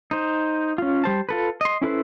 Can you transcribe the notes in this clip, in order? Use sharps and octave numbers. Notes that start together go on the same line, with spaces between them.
D#4 C5
C#4 F4
G3 C5 A5
F4 A4 B4
D#5 C6
C#4 E4 A4 B4 C5